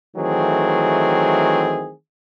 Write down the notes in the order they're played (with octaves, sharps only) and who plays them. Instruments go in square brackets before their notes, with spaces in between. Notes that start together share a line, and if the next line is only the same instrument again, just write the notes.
[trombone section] D#3 E3 F#3 A3 C4 G#4